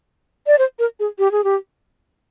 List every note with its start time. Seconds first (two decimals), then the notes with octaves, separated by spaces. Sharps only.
0.47 D5
0.58 C5
0.79 A#4
1.00 G#4
1.19 G4
1.32 G#4
1.44 G4